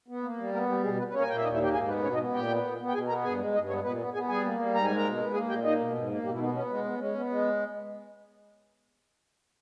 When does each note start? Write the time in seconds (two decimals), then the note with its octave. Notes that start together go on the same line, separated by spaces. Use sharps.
0.08 B3
0.23 A#3
0.38 G3
0.53 A#3 B3 A#4
0.68 G3 G4
0.83 B2 G#3 G#4
0.98 B3 B4
1.09 B4
1.14 A#3 C#4 C#5
1.22 G#5
1.29 A#2 G5
1.37 E5
1.43 D#2 D#4 D#5
1.54 E4 E5
1.59 A#3
1.64 G4 G5
1.73 G#2 G#4 G#5
1.88 B3 B4
2.03 B2 C#4 C#5
2.14 D#4 D#5
2.18 B3
2.33 A#2 G4 G5
2.48 B3
2.63 A#2
2.79 B3
2.89 G5
2.93 B2 G#4 G#5
3.08 B3 A#4 A#5
3.23 G2 G#4 G#5
3.38 G#3
3.53 G2 D#4 D#5
3.68 B3 C#4 C#5
3.83 A#2 B3 B4
3.99 B3
4.14 B3 G#4 G#5
4.28 G3 G#4 G#5
4.44 A#3
4.59 G3
4.75 G#2 A#5
4.85 G#3 G#5
4.96 A#4 A#5
5.03 B2
5.19 B3
5.33 A#3 G#4 G#5
5.49 A#2 G4 G5
5.63 A#3 D#4 D#5
5.80 B2
5.94 G#2
6.09 A#3
6.24 B2 G3 G4
6.34 E4
6.39 D#3 B3 D#4
6.54 B3 C#4
6.70 G#3
6.84 B3
6.99 G#3 C#4
7.14 B3
7.30 G#3